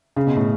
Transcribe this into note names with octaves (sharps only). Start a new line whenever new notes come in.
C#3
B2
A2